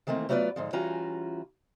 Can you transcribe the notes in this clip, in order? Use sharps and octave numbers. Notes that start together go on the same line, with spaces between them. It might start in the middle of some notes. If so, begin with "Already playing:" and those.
D#3 E3 A3 A#3 C4
F#3 A3 B3 F4 B4 D5
G#2 D3 F3
E3 G3 C#4 F4 F#4 A#5